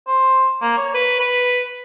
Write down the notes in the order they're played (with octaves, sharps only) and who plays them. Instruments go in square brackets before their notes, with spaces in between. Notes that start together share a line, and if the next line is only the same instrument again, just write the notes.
[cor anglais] C5
A#3
C#5
B4
B4